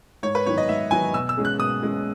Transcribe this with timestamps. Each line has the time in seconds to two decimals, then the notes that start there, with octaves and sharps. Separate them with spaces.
0.23 G#2 C#5
0.35 B4
0.46 D#3 F#3 B3 C#5
0.58 D#5
0.68 G#2 E5
0.91 D#3 F#3 B3 G#5
1.14 B2 E6
1.29 E6
1.37 G#3 C#4 G#4
1.45 F#6
1.59 B2 D#6
1.82 G#3 C#4 G#4